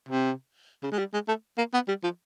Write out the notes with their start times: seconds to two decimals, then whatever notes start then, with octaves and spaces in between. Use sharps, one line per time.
0.09 C3
0.83 C#3
0.92 G#3
0.98 G3
1.13 G#3
1.28 A3
1.58 A#3
1.74 B3
1.88 G3
2.03 F3